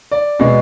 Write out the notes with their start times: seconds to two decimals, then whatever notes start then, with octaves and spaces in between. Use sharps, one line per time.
0.12 D5
0.39 B2 G#3